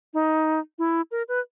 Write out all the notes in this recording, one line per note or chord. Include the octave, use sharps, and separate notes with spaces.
D#4
E4
A#4
B4